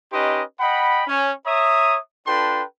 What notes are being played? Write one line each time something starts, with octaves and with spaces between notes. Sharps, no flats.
C#4 D#4 G4 B4 D#5 C6
D#5 F#5 G5 B5
C#4
C#5 E5 A#5 D#6
D4 F4 A4 B4 G5 C6